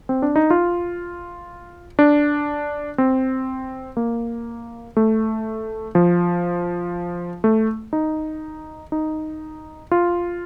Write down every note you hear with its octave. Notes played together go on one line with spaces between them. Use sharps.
C4
D4
D#4
F4
D4
C4
A#3
A3
F3
A3
D#4
D#4
F4